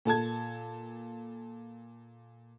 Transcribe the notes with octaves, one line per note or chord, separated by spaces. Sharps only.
A#2 A4 A5 G#6